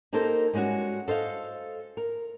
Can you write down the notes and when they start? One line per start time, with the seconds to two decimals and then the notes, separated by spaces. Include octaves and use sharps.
0.13 A#3 D#4 G4 A4 A#4 C5
0.53 G3 G#3 C#4 D#4 F#4
1.08 A4 C5 D#5 F5
1.97 A#4